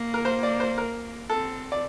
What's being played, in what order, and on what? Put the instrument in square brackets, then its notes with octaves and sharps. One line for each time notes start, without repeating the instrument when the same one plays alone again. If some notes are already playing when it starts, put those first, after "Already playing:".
Already playing: [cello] A#3
[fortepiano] A#4
C5
D5
C5
A#4
[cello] C4 [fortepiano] A4
[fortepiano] D5